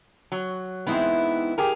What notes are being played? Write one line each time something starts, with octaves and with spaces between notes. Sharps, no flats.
F#3
E3 G#3 B3 C4 D#4 E4
G4 G#4 A#4